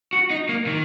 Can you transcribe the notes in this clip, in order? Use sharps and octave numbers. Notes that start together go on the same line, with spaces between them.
F#4
D#4
A#3
D#3